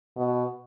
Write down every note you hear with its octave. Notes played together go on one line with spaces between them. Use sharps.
B2